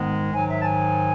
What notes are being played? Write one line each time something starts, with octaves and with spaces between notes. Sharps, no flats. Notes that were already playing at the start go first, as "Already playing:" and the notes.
Already playing: G#2 D#3 G#3 B3
G#2 D#3 F#3 G#5
E5
A5
G#5